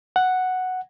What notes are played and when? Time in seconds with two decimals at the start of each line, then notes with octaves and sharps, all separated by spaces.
0.16 F#5